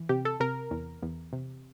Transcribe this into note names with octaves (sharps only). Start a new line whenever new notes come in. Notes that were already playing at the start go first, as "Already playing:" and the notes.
Already playing: E3
C3 G4
A4
C3 A#4
E2
E2
C3